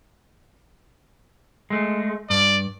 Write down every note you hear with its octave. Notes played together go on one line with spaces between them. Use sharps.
G#3 A3
G2 D5